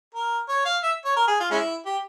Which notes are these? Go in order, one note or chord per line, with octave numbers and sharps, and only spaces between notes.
A#4
C#5
F5
E5
C#5
A#4
G#4
F4
G#3 C#4 E4
G4